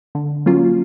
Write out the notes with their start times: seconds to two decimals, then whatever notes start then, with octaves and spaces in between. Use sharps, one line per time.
0.15 D3
0.46 F#3 A#3 C#4 F4